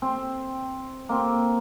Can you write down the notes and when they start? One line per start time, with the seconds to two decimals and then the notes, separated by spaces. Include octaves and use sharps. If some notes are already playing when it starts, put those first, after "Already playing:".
0.02 C4
1.09 A#3 C4